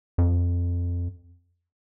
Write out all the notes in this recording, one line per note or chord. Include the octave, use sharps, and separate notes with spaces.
F2